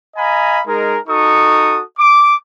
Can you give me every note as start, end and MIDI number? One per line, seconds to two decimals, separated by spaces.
0.16 0.60 75
0.16 0.60 77
0.16 0.60 80
0.16 0.60 82
0.16 0.60 83
0.67 0.98 56
0.67 0.98 63
0.67 0.98 68
0.67 0.98 70
1.09 1.81 63
1.09 1.81 66
1.09 1.81 69
1.09 1.81 85
1.09 1.81 87
1.99 2.34 86